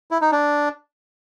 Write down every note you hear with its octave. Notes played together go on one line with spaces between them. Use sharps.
E4
D#4
D4